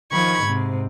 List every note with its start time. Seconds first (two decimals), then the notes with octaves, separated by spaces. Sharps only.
0.11 D#3 F3 B5 C#6 G#6
0.43 G#2 C3